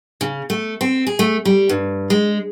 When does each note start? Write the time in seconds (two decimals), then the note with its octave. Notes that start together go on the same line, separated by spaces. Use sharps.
0.21 C#3
0.50 A3
0.81 C4
1.07 G#4
1.19 A3
1.45 G3
1.69 G2
2.10 G#3